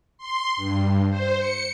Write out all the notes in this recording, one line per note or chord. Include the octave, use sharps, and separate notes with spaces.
C6
G2
C5
C#7